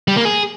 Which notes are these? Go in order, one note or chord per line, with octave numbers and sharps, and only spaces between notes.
G3
A#3
G#4